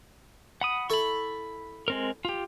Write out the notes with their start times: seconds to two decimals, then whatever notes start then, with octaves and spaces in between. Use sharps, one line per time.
0.61 F#5 B5 D#6
0.90 E4 A4 B5 C#6
1.88 G#3 C4 A#4
2.25 F4 G4